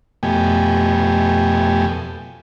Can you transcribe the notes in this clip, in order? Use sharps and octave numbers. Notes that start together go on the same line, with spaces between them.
F2 B2 A3 G4 G#5